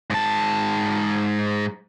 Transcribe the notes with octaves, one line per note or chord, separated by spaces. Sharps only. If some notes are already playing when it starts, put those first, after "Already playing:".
G#2 A5